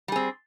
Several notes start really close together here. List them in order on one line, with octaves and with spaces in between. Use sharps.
G3 G#4 C4